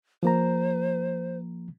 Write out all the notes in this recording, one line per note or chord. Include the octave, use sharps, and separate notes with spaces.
F3 A#3 C5 A#5